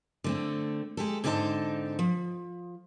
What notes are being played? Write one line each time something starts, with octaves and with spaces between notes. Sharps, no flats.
D3 A3 C4
G#3 G4 A4
G#2 D3 C4 D#4 C5 A5
F3